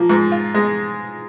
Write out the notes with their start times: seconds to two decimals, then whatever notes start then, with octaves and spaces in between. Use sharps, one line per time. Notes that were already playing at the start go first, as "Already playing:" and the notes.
Already playing: F3 A#3
0.10 G#2
0.32 F4
0.55 G#3